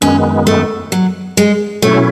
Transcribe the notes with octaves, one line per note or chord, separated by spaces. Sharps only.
F#2 D#3 G#3 B3 C#4
A3
F#3
G#3
B2 F#3 A3 C#4 E4